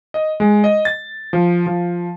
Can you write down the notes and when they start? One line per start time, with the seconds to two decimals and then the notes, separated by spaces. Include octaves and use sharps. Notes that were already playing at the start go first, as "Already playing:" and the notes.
0.14 D#5
0.40 G#3
0.64 D#5
0.85 A6
1.33 F3
1.67 F3